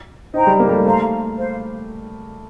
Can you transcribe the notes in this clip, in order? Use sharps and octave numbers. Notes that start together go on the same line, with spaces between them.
D#4 C5 G5 A#5
G3
A#3
G3
A3
A3 C5 F5 A#5
C5 F5